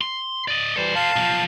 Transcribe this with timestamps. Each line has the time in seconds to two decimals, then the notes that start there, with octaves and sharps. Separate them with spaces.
0.01 C6
0.48 D5 D#5
0.76 E3 G3 A4 C5
0.95 F5 A5
1.16 B1 F3